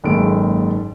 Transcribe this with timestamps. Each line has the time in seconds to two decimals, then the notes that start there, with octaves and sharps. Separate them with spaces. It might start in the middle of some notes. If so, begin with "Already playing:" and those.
0.04 F#1 G#2 D#3 A#3 A4 D7